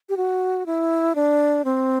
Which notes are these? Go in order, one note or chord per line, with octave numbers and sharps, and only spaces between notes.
G4
F#4
E4
D4
C4